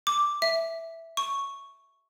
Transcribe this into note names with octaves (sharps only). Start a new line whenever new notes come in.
D6
E5
C#6